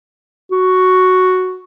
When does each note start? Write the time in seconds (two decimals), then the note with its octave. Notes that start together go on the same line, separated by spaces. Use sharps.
0.52 F#4